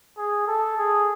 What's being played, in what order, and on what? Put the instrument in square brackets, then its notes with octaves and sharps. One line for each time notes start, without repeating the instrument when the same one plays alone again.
[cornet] G#4
A4
G#4